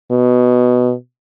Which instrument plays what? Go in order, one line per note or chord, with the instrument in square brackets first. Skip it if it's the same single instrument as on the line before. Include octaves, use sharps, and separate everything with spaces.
[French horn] B2